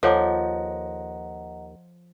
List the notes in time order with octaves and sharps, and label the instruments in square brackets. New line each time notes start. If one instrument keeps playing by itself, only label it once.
[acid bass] D#2 [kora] F3 [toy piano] A4 C#5 D6 [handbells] D#5 F#5 A#5